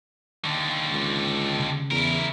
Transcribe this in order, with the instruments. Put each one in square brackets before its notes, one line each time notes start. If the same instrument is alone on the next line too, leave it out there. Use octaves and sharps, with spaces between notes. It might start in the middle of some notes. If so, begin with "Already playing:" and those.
[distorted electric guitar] D#2 D3
[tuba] C#2
[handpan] C#3
[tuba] E2 [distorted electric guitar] E4 A#4